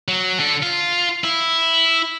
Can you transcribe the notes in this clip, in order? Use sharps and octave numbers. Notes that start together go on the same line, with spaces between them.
F#3
D3 A4
F4
E4